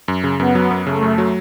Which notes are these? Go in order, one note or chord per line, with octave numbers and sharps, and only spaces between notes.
F#2
C#3
F#2 B3
F#3
F#2
C#3 A3
F#2
F#3